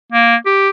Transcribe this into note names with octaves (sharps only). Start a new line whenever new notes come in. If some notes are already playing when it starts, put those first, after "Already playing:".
A#3
G4